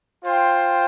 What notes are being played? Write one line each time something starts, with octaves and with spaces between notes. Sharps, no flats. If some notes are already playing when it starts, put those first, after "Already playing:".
F4 C5 G5